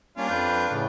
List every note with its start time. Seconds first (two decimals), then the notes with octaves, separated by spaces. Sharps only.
0.17 G3 A#3 C#4 D4 F4
0.30 F2 B4 G6
0.71 A2 C#3